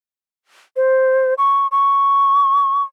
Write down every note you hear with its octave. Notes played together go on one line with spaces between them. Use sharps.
C5
C#6
C#6